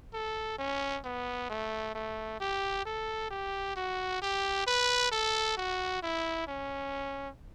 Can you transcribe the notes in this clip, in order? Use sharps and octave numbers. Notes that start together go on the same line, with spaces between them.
A4
C#4
B3
A3
A3
G4
A4
G4
F#4
G4
B4
A4
F#4
E4
C#4